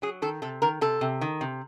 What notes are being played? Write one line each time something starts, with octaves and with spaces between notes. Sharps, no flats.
F#3 G#4
D#3 A4
C3 A4
D#3 A#4
C3 A4
C3
D#3
C3